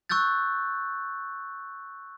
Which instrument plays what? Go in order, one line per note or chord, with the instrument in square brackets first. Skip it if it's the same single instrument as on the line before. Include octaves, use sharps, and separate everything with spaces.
[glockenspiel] C#6 E6 F#6 G6 A6